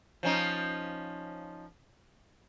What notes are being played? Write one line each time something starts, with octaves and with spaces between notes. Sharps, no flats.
F3 C#4 D#4